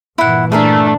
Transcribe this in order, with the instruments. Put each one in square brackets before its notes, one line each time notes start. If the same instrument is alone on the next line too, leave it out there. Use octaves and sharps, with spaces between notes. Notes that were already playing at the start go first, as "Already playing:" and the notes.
[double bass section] G2 A#2 E3 [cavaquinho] E4 F#5
[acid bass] A3 [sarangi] D4 [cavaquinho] G#4 A#4 E5